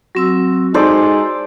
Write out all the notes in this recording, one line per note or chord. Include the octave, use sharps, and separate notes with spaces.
F#3 C4 F#4 E6
G#3 D#4 F#4 A4 C5 D5